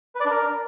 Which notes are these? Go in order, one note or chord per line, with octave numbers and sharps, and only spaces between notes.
B4
D5
D4
A#4